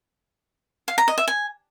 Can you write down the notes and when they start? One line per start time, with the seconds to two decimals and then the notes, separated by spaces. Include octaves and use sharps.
0.88 F5
0.98 A#5
1.08 D#5
1.18 E5
1.28 G#5